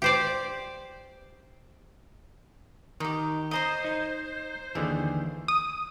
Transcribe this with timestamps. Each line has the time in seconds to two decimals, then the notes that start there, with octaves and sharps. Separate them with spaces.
0.02 G4 C5 D5
3.00 D#3 D#4 G4
3.51 C5 D#5 A#5 D#6
3.84 D#4 C5
4.75 D#2 D3 E3 G#4
5.48 D#6